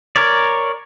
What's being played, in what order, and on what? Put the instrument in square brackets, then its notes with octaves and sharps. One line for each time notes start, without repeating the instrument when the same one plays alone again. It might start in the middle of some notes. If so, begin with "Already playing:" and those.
[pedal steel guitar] A#4 C#5 D5